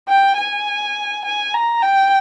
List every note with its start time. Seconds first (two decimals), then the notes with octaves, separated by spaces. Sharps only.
0.09 G5
0.38 G#5
1.25 G#5
1.54 A#5
1.83 G5